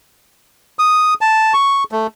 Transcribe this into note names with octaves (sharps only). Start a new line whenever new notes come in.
D#6
A5
C#6
A3